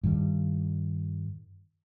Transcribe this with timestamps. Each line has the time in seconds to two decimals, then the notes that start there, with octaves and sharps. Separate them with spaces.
0.04 G2 D#3 G3